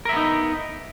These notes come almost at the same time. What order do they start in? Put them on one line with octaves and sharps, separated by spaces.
A#4 E5 B3 D#4